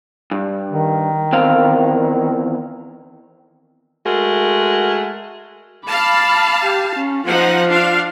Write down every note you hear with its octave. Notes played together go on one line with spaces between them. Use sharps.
G2
D#3
E2 C4 F5
G#3 A3 F#4 A#4
F5 A5 B5 D6
G4
C#4
F3 D#4 F4 F#5
D4 F5